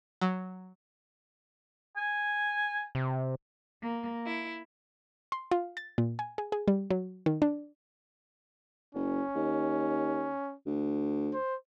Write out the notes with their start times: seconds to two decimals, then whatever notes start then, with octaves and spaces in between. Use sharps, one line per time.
0.21 F#3
1.97 G#5
2.95 C3
3.81 A#3
4.25 E4
5.32 C6
5.51 F4
5.77 A6
5.98 A#2
6.19 G#5
6.38 G#4
6.52 G#4
6.68 G3
6.91 F#3
7.26 D#3
7.42 D4
8.95 F#1 C#4
9.35 D#2
10.66 D2
11.34 C5